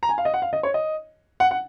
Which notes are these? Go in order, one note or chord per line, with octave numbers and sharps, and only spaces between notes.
A#5
G#5
F5
D#5
F#5
F5
D#5
C#5
D#5
F#5
F#5